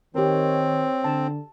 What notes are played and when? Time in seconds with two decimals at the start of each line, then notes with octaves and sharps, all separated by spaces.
0.15 D#3 C4 G4 A#4 C#5
1.04 D3 A5